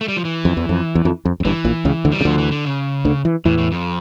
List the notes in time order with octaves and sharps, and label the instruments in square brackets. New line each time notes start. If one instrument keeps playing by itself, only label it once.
[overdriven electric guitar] A3
G3
F3
E3
[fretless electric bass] F2
E2
F2
E2
F2
F2
F2
[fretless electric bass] G1 G2 [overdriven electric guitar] E3
[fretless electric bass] A#1 A#2
C#2 C#3
D2 D3
[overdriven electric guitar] G3
[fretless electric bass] C#3
[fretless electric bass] D2 D3 [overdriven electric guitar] F3
[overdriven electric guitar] E3
D3
C#3
[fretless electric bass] D2 D3
E3
[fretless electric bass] E2 E3 [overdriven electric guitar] A2
[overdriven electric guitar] A2
F2